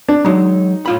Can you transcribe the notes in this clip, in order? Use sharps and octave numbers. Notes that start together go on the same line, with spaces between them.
D4
F#3 G#3 D#4
A2 F4 B5